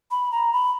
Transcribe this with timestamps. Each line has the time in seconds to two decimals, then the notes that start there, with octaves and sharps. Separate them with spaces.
0.11 B5
0.32 A#5
0.53 B5